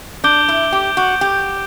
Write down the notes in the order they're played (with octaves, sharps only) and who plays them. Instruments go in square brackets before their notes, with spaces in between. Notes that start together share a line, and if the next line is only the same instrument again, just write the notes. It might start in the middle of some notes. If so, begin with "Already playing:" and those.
[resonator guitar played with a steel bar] D4 [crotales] D6 G6 D7 G7
[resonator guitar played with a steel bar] E4
G4
F#4
G4